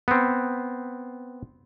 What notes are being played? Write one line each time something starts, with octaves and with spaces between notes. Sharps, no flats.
B3 C4